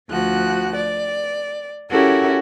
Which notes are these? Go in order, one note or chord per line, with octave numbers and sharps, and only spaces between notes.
D2 F3 F#4 F#6
D5
C#4 E4 F#4 G4 A4 A#4